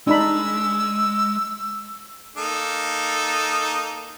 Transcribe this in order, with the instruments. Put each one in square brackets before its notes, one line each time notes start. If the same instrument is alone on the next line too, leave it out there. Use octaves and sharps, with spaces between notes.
[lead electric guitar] G#3 [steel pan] D4 D#4 B5 [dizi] E6
[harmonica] A#3 D#4 A4